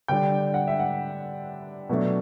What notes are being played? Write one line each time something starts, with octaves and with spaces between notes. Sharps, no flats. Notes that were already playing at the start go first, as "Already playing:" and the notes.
D3 G3 D4 G5
F#5
E5
F#5
B2 F#3 A3 D4